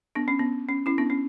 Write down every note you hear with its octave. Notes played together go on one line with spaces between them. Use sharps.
B3 D4
C#4
B3
C#4
C#4 E4
B3 D4
C#4